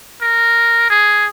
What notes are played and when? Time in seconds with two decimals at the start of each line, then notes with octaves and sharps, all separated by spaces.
0.21 A#4
0.90 G#4